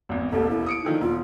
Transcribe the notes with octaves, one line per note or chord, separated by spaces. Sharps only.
G#1 E2
E1 A1 D#2 A4
E4
D#6 C#7 D7
D3 D#3 F3 D#4
E1 F4